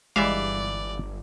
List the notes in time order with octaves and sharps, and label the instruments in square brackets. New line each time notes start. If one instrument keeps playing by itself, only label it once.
[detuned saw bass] G1 [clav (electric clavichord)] E3 E5 F5 [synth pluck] G3 G#3 D6 [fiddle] D5